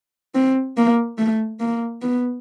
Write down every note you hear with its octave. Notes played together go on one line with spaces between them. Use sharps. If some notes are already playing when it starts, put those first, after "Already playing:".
C4
A#3
A3
A#3
B3